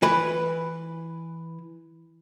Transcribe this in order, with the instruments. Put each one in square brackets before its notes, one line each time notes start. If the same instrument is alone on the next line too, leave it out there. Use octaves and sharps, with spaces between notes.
[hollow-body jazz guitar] E3 B4